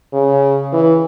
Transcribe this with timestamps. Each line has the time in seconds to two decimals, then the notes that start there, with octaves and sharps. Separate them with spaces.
0.13 C#3
0.73 E3